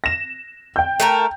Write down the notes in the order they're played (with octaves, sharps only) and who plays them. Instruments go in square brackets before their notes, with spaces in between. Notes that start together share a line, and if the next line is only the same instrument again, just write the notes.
[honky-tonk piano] A#6 E7
G5 G6
[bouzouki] A3 A4 A#4